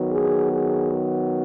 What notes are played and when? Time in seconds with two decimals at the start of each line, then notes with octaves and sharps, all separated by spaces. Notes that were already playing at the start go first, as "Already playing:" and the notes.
Already playing: D#3 F#3 B3
0.11 G#4
0.52 G#4